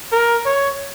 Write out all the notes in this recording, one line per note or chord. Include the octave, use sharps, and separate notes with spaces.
A#4
C#5